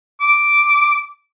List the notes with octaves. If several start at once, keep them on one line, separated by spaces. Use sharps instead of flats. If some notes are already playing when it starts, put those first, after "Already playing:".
D6